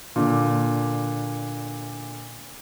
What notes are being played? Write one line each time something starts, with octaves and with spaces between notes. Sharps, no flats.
A#2 D3